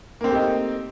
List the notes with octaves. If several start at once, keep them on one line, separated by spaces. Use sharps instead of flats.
A3 A#3 C4 D#4 G4